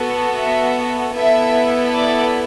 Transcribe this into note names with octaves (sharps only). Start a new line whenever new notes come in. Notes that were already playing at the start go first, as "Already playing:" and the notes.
Already playing: B3 F#4 A4
E5
B3 E4 A4 E5
D5